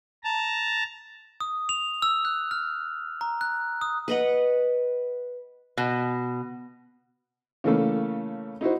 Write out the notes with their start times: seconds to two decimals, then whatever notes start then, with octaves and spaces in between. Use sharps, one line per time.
0.24 A5 A#5
1.40 D#6
1.69 F7
2.02 E6
2.25 F#6
2.51 F6
3.21 A#5
3.41 F#6
3.81 D#6
4.08 B4 D#5 F#5
5.77 B2
7.64 C#3 E3 A3 A#3 A4
8.61 D#4 E4 F#4 C5